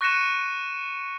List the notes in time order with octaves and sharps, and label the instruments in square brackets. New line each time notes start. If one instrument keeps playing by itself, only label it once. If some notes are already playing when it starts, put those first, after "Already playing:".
[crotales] C#6 F#6 A#6 C#7 D#7 E7